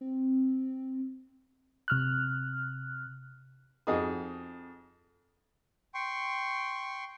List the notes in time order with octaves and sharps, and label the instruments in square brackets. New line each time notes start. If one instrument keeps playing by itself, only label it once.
[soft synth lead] C4
[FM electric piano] C3 F6 F#6
[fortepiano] F2 D#4 F#4 G#4 D#6
[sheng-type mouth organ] G5 C6 C#6